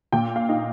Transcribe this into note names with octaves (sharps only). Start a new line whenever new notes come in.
A#2 G5
F5
D#4